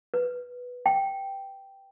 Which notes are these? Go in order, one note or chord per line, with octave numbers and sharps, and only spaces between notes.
B4
G5